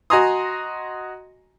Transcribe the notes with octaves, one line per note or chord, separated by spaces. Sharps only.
F#4 D#5 G#5 A#5 C6 D#6